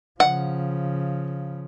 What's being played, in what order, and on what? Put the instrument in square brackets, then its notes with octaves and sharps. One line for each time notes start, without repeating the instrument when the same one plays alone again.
[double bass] C#3 F3 [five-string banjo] F#5